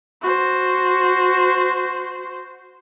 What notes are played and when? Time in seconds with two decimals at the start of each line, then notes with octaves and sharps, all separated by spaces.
0.22 F#4 C5